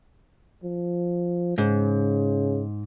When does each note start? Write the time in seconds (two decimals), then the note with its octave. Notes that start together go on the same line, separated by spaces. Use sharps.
0.64 F3
1.58 G#2 C#3